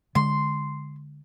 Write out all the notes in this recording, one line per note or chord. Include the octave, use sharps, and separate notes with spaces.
D3 G#3 C6